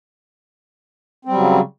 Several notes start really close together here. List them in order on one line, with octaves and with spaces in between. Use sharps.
C4 G3 F#3 C#3